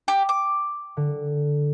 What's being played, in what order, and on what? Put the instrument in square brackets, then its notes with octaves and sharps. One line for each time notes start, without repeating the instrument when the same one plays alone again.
[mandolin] G4
D6
[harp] D3